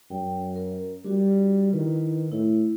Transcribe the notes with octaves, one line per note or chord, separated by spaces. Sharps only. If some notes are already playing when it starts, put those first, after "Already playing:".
F#2 G5
A#4
G3 D4 F#4
D#3 E4 B4
A2 E4